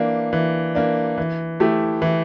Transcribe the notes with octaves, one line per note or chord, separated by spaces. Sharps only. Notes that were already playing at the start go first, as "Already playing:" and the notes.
Already playing: E3 A#3 D4
E3
A#3 D4
E3
A3 E4 G4
E3